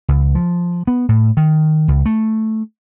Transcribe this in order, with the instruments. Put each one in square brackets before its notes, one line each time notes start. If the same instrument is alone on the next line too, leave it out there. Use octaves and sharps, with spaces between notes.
[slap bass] C#2
F3
B3
A2
D#3
C#2
A3